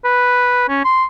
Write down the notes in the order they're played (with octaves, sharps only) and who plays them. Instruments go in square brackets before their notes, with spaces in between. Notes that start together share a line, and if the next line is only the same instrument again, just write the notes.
[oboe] B4
C#4
C6